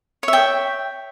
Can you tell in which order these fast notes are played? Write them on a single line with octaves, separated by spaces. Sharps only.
C#5 E5 G5